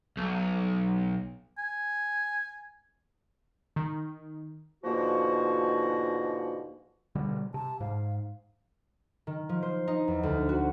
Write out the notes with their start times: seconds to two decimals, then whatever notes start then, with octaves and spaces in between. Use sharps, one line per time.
0.17 B1
1.58 G#5
3.76 D#3
4.84 G#2 B2 D3 F3 A#3 F#4
7.15 B2 D3 G3
7.54 C3 A5
7.80 G#2 F5
9.27 D#3
9.49 F3
9.63 C5
9.88 D#4
10.08 E2
10.23 D2
10.49 F#4